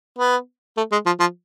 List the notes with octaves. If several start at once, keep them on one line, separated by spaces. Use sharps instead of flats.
B3
A3
G#3
F3
F3